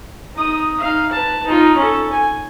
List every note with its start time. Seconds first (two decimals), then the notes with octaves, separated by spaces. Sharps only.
0.35 D#4 D#6
0.80 D#4 F5
1.11 B4 A5
1.46 D#4 F4
1.77 C#4 A4
2.12 G#5